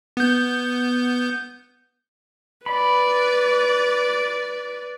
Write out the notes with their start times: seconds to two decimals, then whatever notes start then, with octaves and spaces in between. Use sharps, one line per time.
0.17 B3 G6
2.66 B4 D5 B5